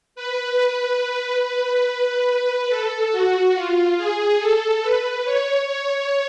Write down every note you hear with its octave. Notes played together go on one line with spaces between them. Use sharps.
B4
B4
A4
F#4
F4
G#4
A4
B4
C#5
C#5